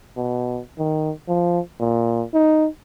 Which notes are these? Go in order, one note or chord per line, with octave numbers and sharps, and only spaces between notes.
B2
D#3
F3
A#2
D#4